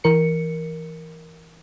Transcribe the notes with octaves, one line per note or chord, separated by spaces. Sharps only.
E3 A#4 C#7